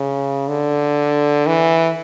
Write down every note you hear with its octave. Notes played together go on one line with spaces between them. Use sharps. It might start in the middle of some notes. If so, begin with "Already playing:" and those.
Already playing: C#3
D3
E3